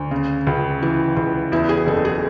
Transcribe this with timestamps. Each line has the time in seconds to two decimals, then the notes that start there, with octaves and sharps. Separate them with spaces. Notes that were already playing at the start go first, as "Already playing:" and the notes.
Already playing: D2
0.11 C#3
0.47 C#2
0.82 E3
1.17 C#2
1.52 E2 E4
1.69 G#4
1.87 F#1 A4
2.05 G#4